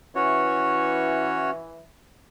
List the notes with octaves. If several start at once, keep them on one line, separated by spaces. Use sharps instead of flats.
E3 C#4 F#4 C#5